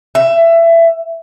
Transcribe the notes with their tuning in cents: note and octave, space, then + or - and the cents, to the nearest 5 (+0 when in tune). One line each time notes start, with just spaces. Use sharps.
E5 +20